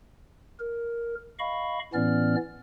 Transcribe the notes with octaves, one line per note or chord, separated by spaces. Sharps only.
A#4
D#5 F5 B5 C#6
A2 E3 B3 C#4 D5 F6